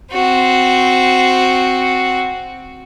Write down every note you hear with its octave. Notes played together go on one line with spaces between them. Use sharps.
C4 F#4